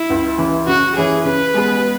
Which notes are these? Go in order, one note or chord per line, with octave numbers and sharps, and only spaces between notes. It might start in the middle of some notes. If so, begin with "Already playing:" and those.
Already playing: E4
C#2
C#3 E3
C#3 F#4
E3 C#4 G#4
C#3 B4
G#3 B3 G#4